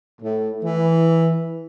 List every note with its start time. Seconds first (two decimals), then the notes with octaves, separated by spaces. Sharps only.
0.21 A2
0.63 E3